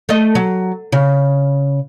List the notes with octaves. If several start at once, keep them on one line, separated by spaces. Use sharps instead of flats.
A3 D#5
F#3
C#3